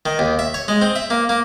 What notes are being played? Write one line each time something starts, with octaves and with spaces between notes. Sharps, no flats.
D#3
D#2
E5
C#5
G#3
C4
E5
A#3
A#3